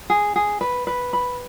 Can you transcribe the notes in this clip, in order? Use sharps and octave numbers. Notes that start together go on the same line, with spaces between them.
G#4
G#4
B4
B4
B5